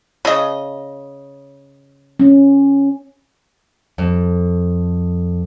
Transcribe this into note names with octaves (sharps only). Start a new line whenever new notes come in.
C#3 D#5
C#4
F2